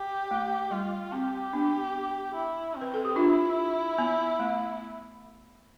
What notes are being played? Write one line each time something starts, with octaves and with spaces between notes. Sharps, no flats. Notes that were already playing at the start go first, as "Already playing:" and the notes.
Already playing: G4
A3
G3 F4
C4 G4
B3 D4
E4
C4
B4
A4
G4
D4 E4 F4
B3
A3